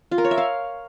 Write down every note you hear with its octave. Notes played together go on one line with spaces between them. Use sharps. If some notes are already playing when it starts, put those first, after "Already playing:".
F4
A#4
C#5
E5
F5